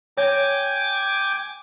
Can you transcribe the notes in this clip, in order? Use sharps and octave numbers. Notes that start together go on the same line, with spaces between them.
C#5 G5 G#5 D6